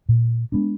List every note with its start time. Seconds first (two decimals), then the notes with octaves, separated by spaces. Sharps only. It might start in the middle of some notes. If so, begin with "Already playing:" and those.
0.09 A#2
0.52 G#3 B3 D4